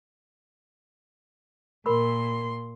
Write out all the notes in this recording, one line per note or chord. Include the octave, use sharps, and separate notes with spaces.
A#2 A#4 B5 C6 E6